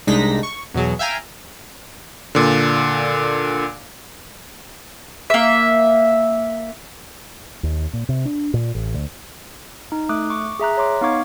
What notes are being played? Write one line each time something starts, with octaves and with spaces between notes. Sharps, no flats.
C2 G#3 D4 D#4 A#6 B6
C#6
E2 B2 F#3 G#4
E5 F5 G5 G#5 A#5
A#2 D3
A#3 E5
D#2
A#2
C3
D4
A#2
A1
D2
D#4
A3 D6 D#6 F#6
C#6 D6
G#4 E5 A#5 F#6
C#5 A#5 C6 D6
B3 D#4 F5 C#6 D6 G#6